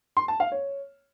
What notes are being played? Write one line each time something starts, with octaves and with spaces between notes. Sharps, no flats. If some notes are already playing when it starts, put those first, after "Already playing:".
C6
A5
F5
C#5